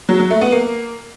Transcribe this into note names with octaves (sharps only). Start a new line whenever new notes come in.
F#3
F#3
A3
B3
A#3